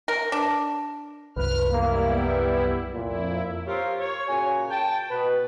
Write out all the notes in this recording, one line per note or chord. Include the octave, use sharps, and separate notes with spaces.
A#4
D4
C2 F#2 B4 F6
G3 A#3 E4
B3
F2 A#2 E4
C4 F4 G4 A#4 C#5
C#5
A#2 C#3 F#4 G#5
G5 A5
B2 B4